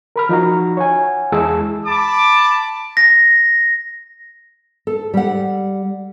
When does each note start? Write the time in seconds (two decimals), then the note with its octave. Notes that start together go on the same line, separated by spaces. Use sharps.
0.16 A#4 B5 F6
0.29 F3 D#4 F#4 A#5
0.77 C#5 F#5 G#5
1.32 E2 G#3 E4 G#4 A5 E6
1.86 A5 B5 D6
2.97 A#6
4.87 A4
5.14 G3 F#5